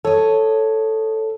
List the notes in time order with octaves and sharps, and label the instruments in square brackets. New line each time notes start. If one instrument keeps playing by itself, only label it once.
[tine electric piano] A4 [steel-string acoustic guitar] C#5 D#5